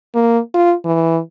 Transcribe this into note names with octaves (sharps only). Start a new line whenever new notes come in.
A#3
F4
E3